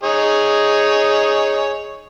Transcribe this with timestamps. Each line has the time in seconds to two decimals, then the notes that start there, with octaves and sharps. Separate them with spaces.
0.03 D#4 G#4 C#5